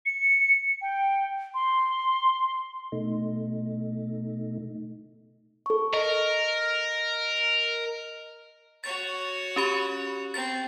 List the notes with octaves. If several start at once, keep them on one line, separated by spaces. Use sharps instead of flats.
C#7
G5
C6
B2 A3 D#4
A4 C#6
A#4 D#5
F#4 C#5 A6
C#4 G4 B5
C4 A6